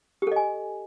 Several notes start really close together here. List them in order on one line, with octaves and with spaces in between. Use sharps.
G4 A4 D#5 G#5